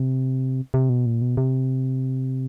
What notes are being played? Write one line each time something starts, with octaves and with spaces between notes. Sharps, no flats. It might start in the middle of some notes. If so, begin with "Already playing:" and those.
Already playing: C3
C3
B2
A#2
B2
C3